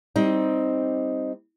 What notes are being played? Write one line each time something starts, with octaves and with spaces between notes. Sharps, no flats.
G3 C4 D#4